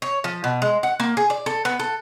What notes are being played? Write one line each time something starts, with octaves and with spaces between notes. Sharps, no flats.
C#5
F3
B2
G#3
F#5
A#3
G#4
D5
A4
B3
A4